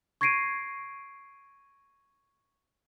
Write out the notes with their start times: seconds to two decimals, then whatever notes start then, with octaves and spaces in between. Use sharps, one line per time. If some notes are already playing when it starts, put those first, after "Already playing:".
0.21 C#6 G#6 A#6 C7 D7 D#7